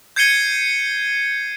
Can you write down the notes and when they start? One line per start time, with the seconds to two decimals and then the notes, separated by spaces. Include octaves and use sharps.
0.16 G6 G#6 C7 C#7 D#7 G7